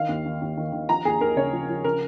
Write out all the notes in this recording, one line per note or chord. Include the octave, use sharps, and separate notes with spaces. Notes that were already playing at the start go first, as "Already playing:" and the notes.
Already playing: D#3 F5
D#2
D#3
D#2
D#3
D#3
F3 A#5
D#2 G#4
D#2 A#4
C#3 C#5
F3
F3
C#3 A#4